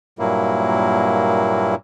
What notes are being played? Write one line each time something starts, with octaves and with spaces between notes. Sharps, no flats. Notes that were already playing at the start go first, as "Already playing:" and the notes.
G2 A#2 F#3 A#3 E4